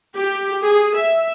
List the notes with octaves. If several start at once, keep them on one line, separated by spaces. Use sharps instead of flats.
G4
G#4
E5